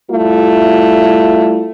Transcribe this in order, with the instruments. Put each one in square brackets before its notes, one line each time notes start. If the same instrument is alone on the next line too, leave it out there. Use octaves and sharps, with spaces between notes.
[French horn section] G3 A3 E4 F4